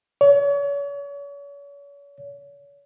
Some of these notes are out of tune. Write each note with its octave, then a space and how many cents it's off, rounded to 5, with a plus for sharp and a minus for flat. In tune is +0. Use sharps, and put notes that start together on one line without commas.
C#5 +40